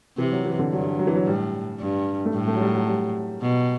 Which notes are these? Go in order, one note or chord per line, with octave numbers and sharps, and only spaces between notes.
C3 E3
F#3
E3
D3
G2 F#3
F#3
E3
F#3
A2 G3
G2
A3
A2 G3
A3
F#3
G3
F#3
G3
B2